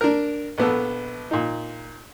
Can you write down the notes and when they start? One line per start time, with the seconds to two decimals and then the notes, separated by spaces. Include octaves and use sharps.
0.01 D4 A#4
0.58 A#1 B3 A4
1.31 A#2 D#4